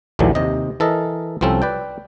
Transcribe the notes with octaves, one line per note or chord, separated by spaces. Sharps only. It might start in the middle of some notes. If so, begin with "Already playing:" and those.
A#1 D#2 A2 D3 E3 F#3
D#2 C3 D#5
E3 A4 A#4 D#5
C2 F3 C4 C#4 A4
B4 D5 G5